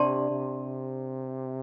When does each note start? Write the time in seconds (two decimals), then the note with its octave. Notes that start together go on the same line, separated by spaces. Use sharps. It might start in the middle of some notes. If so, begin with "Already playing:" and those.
Already playing: C3 D4 G4 D5 A5 C6
0.31 C3